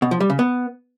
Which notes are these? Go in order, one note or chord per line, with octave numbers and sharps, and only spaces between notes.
B2
F3
G3
C#3
B3